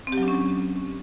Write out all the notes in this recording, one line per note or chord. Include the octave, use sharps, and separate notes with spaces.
C4
G4
F#3
D4
C#4